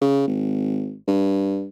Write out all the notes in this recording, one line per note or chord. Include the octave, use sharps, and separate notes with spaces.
C#3
G#1
G2